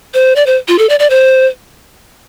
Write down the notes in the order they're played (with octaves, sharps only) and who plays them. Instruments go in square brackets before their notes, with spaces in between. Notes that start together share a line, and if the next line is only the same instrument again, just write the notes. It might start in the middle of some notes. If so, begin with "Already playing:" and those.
[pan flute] C5
D5
C5
F4
A4
D5
D5
C5